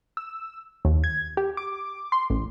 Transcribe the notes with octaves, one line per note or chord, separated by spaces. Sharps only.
E6
D#2
G#6
G4
D6
C6
A1